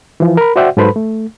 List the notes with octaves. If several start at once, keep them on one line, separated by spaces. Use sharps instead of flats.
E3 F3
A#4 B5
F#4 C5 D5 E5 F#5 G5
G#2 F#3 A4 B4 C5 B5
A3